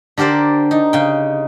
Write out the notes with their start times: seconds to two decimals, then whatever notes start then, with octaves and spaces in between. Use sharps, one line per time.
0.17 D3 G4 A#4 C5 D5
0.71 D#4
0.93 C#3 G5